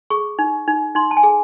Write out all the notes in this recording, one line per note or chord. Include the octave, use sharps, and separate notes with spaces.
G#4 C#6
D#4
D#4
D#4 C6
A5
G#5
G#4